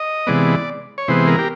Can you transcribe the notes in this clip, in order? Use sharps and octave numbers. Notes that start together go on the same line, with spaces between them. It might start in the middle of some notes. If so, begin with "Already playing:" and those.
Already playing: D#5
C3 E3 G#3 B3 D5
C#5
C3 E3 G#3 B3 C5
A#4
G4